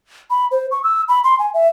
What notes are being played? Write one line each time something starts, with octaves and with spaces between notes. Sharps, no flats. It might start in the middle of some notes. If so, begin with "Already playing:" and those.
B5
C5
C#6
E6
B5
C6
G#5
E5